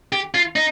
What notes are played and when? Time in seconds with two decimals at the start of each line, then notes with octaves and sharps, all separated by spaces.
0.12 G4
0.34 F4
0.56 D#4